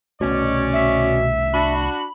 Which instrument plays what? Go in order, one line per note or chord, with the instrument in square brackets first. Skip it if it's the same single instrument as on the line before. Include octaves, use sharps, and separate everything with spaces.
[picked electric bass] C2 A3 [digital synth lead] B2 [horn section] C#4 C#5 D5
[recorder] E5
[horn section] D4 F#4 [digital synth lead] B5